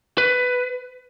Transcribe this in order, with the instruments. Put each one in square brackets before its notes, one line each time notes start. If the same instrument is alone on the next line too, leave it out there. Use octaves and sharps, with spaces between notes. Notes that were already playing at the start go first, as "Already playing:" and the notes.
[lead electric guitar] B4